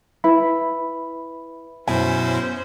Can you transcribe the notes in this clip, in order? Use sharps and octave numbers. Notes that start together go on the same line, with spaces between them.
E4 B4 E5 B5
F#2 B2 C#4 E4 C5 G#5